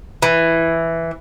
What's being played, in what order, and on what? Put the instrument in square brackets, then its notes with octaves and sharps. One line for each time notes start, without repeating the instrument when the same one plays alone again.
[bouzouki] E3